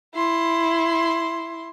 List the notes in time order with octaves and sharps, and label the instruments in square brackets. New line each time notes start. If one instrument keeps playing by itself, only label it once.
[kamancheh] E4 C6